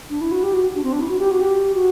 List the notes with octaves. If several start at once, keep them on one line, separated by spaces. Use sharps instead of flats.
D4
E4
F#4
G4
F#4
D4
C4
D4
E4
F#4
G4
F#4
G4
F#4